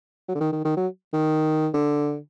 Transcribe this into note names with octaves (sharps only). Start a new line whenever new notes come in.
F#3
D3
D#3
D#3
D#3
F#3
D#3
D3